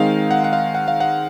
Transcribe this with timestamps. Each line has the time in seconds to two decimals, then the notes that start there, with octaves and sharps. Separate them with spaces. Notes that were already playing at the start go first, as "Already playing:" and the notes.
Already playing: D#3 G#3 C4 D#4 F5
0.31 F#5
0.44 F#5
0.53 F5
0.75 F#5
0.88 F5
1.01 F#5